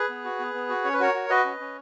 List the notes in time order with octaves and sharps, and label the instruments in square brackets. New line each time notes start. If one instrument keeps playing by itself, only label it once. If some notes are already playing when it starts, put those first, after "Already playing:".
Already playing: [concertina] G#4 B4
B3
F#4
B3
B3
F#4
C#4 C#5
B4
F#4 A#4 C#5
F#4
F#4 B4 D#5
C#4
C#4